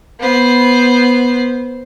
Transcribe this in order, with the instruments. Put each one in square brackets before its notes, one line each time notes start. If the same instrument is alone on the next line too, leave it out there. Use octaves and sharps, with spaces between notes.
[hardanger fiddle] B3 C5